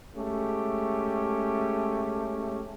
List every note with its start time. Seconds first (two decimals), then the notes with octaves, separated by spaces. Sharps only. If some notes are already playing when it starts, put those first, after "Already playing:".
0.16 G#3 A3 C#4 G4